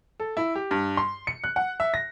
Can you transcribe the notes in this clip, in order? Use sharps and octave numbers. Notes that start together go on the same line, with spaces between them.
A4
E4
G4
G2
C6
C#7
F#6
F#5
E5
A#6